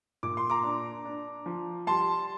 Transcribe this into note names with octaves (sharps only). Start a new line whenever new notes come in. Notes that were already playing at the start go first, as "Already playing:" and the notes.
A#2 D6
C6
A#5 D6
D4
D4
F3
G3 A5 C6